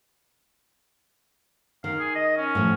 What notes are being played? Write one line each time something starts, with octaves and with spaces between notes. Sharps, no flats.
D#3 F5
G#4
D#5
C#4
A2 F3